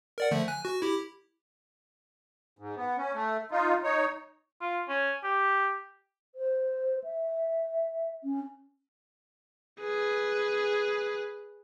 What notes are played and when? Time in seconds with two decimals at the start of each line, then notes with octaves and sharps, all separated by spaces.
0.18 A#4 D5 F#5
0.31 D3 F3 A3
0.48 G#5 F#6
0.65 F#4
0.82 E4 G4
2.59 G#2
2.76 B3
2.97 C#4
3.14 A3
3.51 D#4 F4
3.83 D#4 C#5
4.61 F4
4.89 C#4
5.24 G4
6.35 C5
7.04 E5
8.24 C#4
9.81 G#4 B4